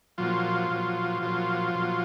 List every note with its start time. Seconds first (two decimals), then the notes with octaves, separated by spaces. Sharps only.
0.18 A#2 F3 F#3 F4
0.70 A#2 F#3
1.22 A#2 F3 F#3 F4
1.75 A#2 F#3